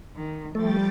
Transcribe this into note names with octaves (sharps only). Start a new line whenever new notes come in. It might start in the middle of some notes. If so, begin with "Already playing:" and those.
D#3
F3 G3 A3 G5 A6